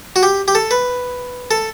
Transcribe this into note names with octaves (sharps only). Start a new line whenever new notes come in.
F#4
G4
G4
A4
B4
A4